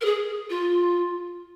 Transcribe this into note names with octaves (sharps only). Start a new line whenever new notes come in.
A#4
G#4
F4